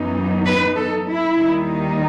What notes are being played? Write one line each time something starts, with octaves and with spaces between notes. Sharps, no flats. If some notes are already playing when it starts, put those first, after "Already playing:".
Already playing: F#2 E3 B3 D#4
B4
A4
E4
D#2 D#3 G3 D#4